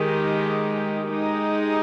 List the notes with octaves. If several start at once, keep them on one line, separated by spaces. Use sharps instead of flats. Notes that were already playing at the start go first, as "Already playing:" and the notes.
Already playing: D#3 G#3 D#4 G4
G#3 D#4 G4